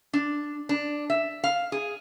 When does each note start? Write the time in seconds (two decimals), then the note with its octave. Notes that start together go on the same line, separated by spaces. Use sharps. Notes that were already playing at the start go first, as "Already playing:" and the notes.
0.13 D4
0.69 D4
1.10 E5
1.44 F5
1.72 G#4